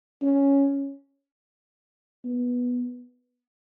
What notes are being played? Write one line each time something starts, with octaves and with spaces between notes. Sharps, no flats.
C#4
B3